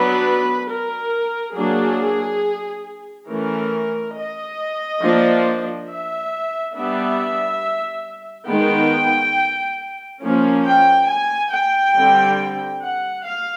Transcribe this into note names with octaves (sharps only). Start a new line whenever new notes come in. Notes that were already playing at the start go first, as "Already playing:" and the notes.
Already playing: F#3 B3 D4 B4
A#4
F#3 A#3 D4 G#4
E3 A3 C#4 A#4
D#5
F3 A#3 D4
E5
G3 B3 D4 E5
D#3 G#3 B3 G5
F3 A#3 C#4
G5
G#5
G5
D3 G3 C4
F#5
F5